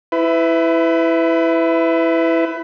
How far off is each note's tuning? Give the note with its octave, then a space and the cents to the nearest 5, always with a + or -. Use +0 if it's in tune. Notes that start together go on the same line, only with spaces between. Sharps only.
E4 +0 B4 +30